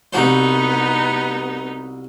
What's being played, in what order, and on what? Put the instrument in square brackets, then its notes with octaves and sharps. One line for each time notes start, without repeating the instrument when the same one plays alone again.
[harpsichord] C2 F#4 C5 [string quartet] B3 D#4